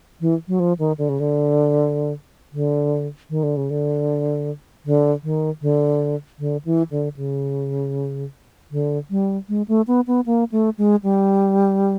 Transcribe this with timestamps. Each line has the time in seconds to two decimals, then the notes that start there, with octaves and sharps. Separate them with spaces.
0.21 E3
0.48 F#3
0.60 F3
0.79 D#3
0.98 D3
1.09 C#3
1.20 D3
2.53 D3
3.30 D#3
3.43 D3
3.57 C#3
3.70 D3
4.85 D3
5.23 D#3
5.62 D3
6.39 D3
6.65 E3
6.91 D3
7.16 C#3
8.71 D3
9.10 G3
9.49 G#3
9.68 A3
9.87 B3
10.07 B3
10.26 A#3
10.52 A3
10.78 G#3
11.03 G3